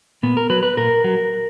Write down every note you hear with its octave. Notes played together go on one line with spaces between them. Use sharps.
A#2 B3
A#4
F#3 B4
B4
A#2 A#4
F#3